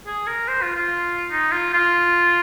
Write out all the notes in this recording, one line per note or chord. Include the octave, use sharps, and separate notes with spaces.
G#4
A#4
C5
F4
F4
D#4
F4
F4